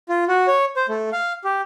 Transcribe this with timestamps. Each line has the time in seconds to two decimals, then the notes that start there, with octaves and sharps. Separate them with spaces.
0.09 F4
0.28 F#4
0.47 C#5
0.76 C5
0.89 A3
1.12 F5
1.44 G4